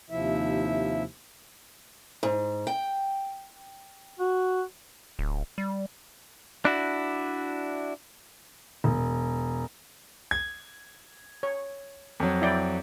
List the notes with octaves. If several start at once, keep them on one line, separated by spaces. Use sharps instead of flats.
D#2 C3 F3 E4 E5
G#2
G5
F#4
D1
G3
D4 E4 F#4
E1
G#6
C#5
F2 F#3
E4 D5 G5